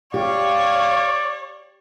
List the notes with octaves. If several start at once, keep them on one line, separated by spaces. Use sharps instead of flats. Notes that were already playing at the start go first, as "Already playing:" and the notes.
G4 C#5 D5 F5